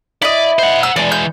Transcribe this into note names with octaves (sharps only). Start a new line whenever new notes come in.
E4 D5 D#5
C5 F#5
E6
E3 G#3 D5
G6